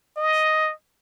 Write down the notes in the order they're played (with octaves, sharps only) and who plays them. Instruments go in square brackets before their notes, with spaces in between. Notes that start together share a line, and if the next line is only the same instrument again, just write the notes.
[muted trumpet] D#5